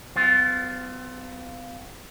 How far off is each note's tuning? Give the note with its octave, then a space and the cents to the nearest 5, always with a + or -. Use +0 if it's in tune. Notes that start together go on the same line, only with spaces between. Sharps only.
F#3 +35 B3 +45 F4 +0